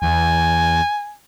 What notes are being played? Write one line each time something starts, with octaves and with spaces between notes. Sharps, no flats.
E2 G#5